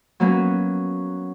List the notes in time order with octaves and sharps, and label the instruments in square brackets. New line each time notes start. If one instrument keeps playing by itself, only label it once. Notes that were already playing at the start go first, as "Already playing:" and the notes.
[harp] F#3 A#3 B3 C#4